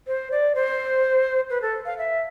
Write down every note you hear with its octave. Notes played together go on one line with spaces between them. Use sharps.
C5
D5
C5
B4
A4
F5
E5